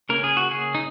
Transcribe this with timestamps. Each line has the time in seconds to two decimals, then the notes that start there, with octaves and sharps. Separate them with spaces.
0.09 C#3 A#3 C#4 A#4
0.24 G#4
0.37 F#4
0.51 G#4
0.75 D#4